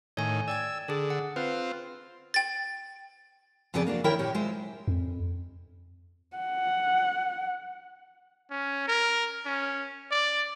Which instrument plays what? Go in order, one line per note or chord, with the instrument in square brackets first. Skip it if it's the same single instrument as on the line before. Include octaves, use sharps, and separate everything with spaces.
[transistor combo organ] A2 D#3 [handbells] C#5 G#5
[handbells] D5 G5 G#6 [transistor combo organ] E6
[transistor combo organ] D3 [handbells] G#4 A4
[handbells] F#5
[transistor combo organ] C4 F4 [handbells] B4
[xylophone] G5 A6
[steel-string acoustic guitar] F2 C#3 B3 G#4 D5
A#3 D4 F#4
D#3 E4 A#4 C#5 E5 G5
A#2 G4 C#5
G#3 F4 C5 E5
[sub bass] F2
[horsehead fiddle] F#5
[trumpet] C#4
A#4
C#4
D5